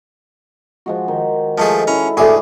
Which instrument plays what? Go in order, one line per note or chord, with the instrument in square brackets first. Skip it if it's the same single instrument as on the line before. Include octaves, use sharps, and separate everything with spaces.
[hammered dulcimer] F3 G#3 F#4
D#3
[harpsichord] F3 A3 G#4 [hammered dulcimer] G#3 A4
[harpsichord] C#4 A#5 [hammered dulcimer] E4
[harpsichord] D2 G#4 [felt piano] A4 E5 G#5 [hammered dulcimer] D6